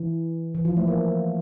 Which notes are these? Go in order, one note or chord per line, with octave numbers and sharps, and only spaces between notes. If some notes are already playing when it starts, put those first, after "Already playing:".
Already playing: E3
E3
F3
A3
A#3